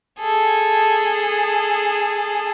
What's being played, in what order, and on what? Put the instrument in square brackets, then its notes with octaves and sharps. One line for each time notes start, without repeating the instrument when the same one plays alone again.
[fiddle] G#4 A4